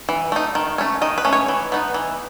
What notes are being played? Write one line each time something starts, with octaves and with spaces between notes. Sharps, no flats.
E3
A3 D#4
D#3
A3 C#4
D#3 D#5
B4
A3 C#4
C#5
E3
B3 D#4
E3